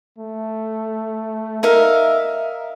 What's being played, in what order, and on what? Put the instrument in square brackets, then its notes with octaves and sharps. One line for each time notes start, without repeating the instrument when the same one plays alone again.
[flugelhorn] A3
[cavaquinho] D#4 A#4 F5 [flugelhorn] E5